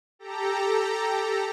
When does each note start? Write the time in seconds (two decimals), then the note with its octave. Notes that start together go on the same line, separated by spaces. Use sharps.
0.19 G4 A4 A#5